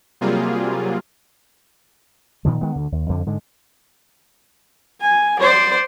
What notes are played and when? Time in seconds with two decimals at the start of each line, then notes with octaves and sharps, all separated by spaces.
0.21 C3 F#3 G3 A#3 F4 G#4
2.45 A#2 D#3 F3
2.61 D#3 G#3 B3
2.76 D2 D3
2.92 D#2
3.09 F2 D3 F3
3.26 G#2 D3 G#3
5.01 G#5
5.39 C5 D5